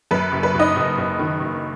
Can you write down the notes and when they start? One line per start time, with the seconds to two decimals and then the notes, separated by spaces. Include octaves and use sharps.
0.11 F#2 B4
0.32 F#1
0.43 B4
0.55 F#1 D#4 D#5
0.76 F#1
0.98 F#1
1.19 D#3
1.40 F#1